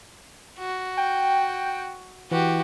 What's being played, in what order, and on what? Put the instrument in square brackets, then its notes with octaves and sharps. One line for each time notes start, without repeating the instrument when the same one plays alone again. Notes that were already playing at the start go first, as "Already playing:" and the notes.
[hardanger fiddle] F#4
[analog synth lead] G5
[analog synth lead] E3 [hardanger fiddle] F#4 G4